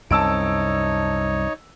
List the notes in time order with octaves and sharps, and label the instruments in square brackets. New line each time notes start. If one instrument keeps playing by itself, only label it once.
[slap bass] C2 F#2 [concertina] D#4 C#5 [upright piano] A5 E6 D7